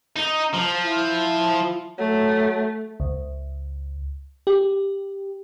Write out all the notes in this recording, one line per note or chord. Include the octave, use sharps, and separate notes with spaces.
D#4
F3
E4
F#3 A3
C#2
G4